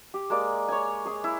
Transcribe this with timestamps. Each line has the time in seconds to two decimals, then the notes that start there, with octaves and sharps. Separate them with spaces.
0.14 G4
0.30 G#3 A#3 D5
0.69 C#5 G#5
1.05 G#4 D#6
1.24 E4